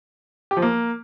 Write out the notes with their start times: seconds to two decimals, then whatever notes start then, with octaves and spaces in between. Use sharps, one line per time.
0.51 G4
0.57 F3
0.62 A#3